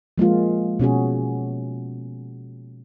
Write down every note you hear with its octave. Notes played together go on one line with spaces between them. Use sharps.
F3 G#3 A#3 F4
B2 C#4 F#4 G#4